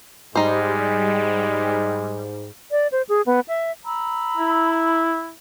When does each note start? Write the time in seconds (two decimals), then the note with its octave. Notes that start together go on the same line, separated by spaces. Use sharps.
0.35 G#2 G3 G#3 D#4 C5
2.71 D5
2.92 C5
3.09 G#4
3.26 B3
3.48 E5
3.85 A#5 B5 E6
4.37 E4